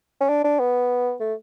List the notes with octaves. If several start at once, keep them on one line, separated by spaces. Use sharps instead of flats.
C#4
D4
D4
B3
A3